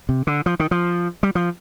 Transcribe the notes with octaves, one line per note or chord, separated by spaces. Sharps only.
C3
D3
F3
D#3
F3
G3
F3